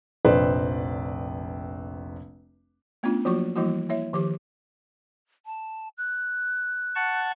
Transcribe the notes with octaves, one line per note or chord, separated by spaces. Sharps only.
F1 A#1 B4 C5 D5
A3 B3 C#4 D4 F4
F3 F#3 A#3 F4 F#4 C#6
E3 F3 G3 A#3 E4 F#4
A#3 E4 C#5 E5
D#3 F3 G4 D6
A5
F#6
F#5 A5 C#6